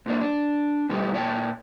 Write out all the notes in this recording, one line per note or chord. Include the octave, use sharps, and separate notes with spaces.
G#2 A#3 D4
D4
G#2 B2 G3 A3 D#4 G4
A#2 C#5 D5 G5 A5